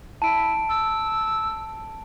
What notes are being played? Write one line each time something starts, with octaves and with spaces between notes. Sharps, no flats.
E4 A5 D7
E6